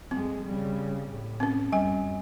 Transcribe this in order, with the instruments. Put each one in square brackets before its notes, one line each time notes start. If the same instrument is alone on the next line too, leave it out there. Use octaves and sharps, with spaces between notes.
[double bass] F2 G#3 [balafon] C4
[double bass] C#3 G3
A2
[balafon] C4 C#4
[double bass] F#2 [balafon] G3 G#5